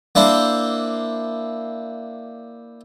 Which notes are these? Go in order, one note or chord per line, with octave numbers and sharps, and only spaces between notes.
A#3 D4 E4 C5